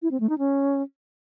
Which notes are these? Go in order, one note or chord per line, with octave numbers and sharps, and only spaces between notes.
E4
C4
A3
D#4
C#4